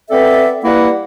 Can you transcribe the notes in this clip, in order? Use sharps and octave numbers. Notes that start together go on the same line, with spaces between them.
B3 C4 A4 D5 E5
G3 A#3 E4 B4 F#5